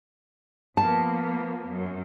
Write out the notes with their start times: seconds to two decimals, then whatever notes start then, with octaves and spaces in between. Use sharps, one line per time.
0.77 F3 A#3 B3 A5
1.69 F#2